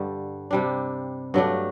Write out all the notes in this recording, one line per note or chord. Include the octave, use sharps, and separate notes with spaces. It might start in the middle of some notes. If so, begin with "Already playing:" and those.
Already playing: G2 D3 G3
C3 G3 D4
G2 F#3 A3 D4